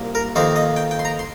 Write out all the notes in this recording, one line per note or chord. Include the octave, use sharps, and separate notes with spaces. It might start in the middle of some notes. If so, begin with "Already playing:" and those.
Already playing: C2 A#2 A#3
A#4
F2 D#3 A#3 D#4 C5
D#5
G5
G5
C6
A#5
C6